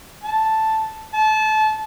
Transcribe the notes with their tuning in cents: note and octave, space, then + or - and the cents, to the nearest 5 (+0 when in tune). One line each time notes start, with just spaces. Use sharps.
A5 +0
A5 -25